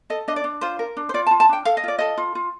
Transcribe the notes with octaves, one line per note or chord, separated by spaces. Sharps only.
A4 D#5
D4 D#5
D5
D4
F4 C5
A#4
D4
C5
F4 D5
A5
F4
A5
D4 G5
A4 F5
D#5
F4 D5
A4 D#5
F4
F4